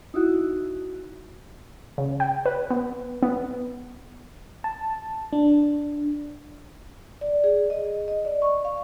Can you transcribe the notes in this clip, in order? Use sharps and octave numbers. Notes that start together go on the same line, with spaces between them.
D#4 E4 F#4
C#3
G5
B4
B3
B3
A5
D4
D5
G#4
D#5
D#5
D5
C#6
F5